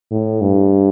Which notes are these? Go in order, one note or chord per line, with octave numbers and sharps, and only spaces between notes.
A2
G2